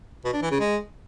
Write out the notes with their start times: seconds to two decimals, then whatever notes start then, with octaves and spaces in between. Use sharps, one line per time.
0.24 B2
0.33 D4
0.42 E3
0.51 C#3
0.60 G#3